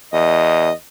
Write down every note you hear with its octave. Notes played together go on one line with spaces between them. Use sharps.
E2 D#5